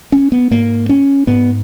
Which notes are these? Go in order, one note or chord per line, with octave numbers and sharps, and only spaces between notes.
C#4
B3
G#2 A#3
C#4
G#2 B3